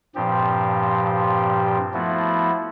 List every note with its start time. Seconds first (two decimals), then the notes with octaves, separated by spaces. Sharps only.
0.15 G2 A#2 F3 C4 G4
1.94 F3 A3 B3 E4 F#4